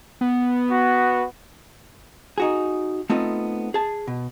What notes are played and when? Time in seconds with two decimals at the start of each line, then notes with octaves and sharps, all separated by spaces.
0.21 B3
0.70 F#4
2.38 D#4 F#4 G#4
3.10 A3 B3 C4 D#4 F4 A4
3.74 G#4 A5
4.07 B2